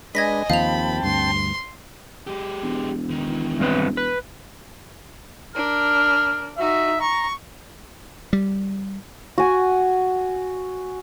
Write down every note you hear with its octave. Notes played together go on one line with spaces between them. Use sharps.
G#3 D4 B4 D#5 G#5 G#6 A#6 B6
D#2 F3 C4 F5 G5 A5 B5 F7
D2 G2 C6
G#3 G4
E1
D#3 E3
G2 C4 B4
B4
D4 A#4 F6
D#4 F#4 E5
A#5 C#6
G3
F#4 G#5